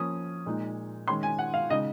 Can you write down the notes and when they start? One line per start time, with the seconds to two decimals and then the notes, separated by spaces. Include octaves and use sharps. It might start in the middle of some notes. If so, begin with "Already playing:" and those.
Already playing: F3 A#3 C#4 D#6
0.46 A#2 G#3 D#4
1.08 D#3 G#3 C#4 C6
1.23 G#5
1.39 F#5
1.54 F5
1.69 C#3 G#3 D#4 D#5